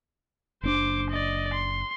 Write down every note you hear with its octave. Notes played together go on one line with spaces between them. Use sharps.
F#1 C#4 D4 C5 D6
D5 D#5
C6